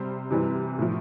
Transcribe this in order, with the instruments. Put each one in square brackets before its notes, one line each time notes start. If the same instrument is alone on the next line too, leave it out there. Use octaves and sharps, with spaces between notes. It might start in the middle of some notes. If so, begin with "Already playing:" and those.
Already playing: [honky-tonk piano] C3 G3 C5
C3 E3 G3
A2 F3